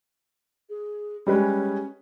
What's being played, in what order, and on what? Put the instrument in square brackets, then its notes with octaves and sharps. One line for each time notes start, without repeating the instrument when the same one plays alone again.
[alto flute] G#4
[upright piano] G3 G#3 B4 [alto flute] C#4